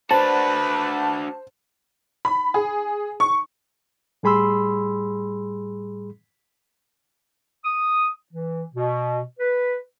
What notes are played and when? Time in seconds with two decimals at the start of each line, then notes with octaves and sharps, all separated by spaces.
0.11 D4 F#4 B4 C5 A5
2.25 B5
2.54 G#4
3.20 C#6
4.23 A2 G3 G#4 B5 C6 E6
7.65 D#6
8.33 E3
8.74 B2
9.39 B4